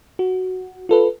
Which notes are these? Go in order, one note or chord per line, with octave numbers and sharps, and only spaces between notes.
F#4
F4 A4 B4